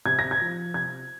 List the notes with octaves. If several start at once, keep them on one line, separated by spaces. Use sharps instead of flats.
C3 G#6
A#6
G#6
F3
C3 G#6